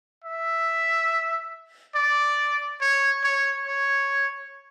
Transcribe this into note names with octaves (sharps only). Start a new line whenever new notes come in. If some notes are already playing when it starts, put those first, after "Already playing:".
E5
D5
C#5
C#5
C#5